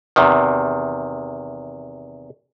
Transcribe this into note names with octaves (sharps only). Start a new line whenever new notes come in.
E2 C3 D#3